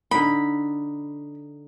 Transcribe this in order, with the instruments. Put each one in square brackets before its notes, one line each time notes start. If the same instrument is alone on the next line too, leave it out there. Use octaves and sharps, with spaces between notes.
[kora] D3 D#4 [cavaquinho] B5